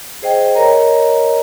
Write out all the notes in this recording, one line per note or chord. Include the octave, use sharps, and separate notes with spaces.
G#4 C5 D#5 G5
A#4 C#5 D#5 A#5